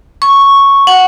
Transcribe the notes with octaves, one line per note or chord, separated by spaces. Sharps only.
C#6
F#5